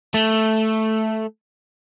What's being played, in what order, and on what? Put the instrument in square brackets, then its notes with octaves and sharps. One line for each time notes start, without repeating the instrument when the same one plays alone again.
[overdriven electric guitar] A3